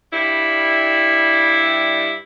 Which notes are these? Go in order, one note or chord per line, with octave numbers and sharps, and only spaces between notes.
G2 G3 E4